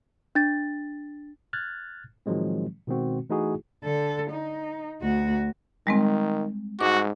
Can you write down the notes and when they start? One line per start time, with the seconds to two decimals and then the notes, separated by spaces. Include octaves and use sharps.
0.35 D4 A6
1.53 F6 F#6 G#6 A6
2.26 A2 D#3 F3 F#3 G#3 C4
2.87 B2 D#3 G#3 C4 F#4
3.30 E3 A3 D#4 E4 F#4 G#4
3.83 D3 A4
4.30 D#4
5.02 D2 F#4
5.87 D#3 G3 G#3 C4
6.81 G#2 F#4 D6